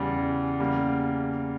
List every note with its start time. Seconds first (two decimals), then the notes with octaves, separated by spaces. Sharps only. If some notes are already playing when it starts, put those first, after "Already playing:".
Already playing: E2 C#3 G3
0.60 E2 C#3 G3 A#3